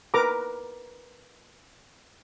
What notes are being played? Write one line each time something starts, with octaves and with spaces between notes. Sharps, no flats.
A#4 B4 A#5 D6